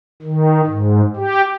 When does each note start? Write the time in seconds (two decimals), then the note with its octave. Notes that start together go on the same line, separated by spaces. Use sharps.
0.22 D#3
0.66 G#2
1.16 G4